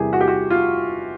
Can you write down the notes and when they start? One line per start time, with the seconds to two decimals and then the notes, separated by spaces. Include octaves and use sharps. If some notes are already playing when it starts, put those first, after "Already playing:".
Already playing: E2 C3 E3 G3 A#3 G4 G#4
0.13 F#4
0.21 G4
0.28 F#4
0.50 F4